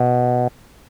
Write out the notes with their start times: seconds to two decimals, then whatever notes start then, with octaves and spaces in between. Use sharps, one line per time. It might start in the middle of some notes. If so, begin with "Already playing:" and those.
Already playing: B2